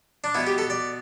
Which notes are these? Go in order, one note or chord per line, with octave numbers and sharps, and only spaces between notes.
D4
B2 B3 E4
G4
A4
D5